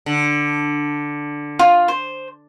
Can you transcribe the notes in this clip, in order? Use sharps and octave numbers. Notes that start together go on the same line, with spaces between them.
D3
F4
C5